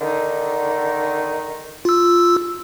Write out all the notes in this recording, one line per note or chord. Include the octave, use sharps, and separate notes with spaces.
D3 D#3 D#4
F4 E6